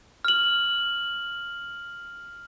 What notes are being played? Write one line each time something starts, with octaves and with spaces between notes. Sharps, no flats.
F6 F#7